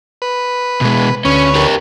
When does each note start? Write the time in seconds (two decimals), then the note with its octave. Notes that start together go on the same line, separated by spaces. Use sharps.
0.22 B4
0.81 B2 G#3
1.25 D2 C#4 B4 C#5
1.55 G4 A#4